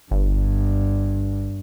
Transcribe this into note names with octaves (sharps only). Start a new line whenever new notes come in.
G1 G2